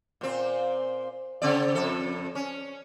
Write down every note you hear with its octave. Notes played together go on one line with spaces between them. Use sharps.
A#2 C4
C#3 C4 D5
F2 A4
C#4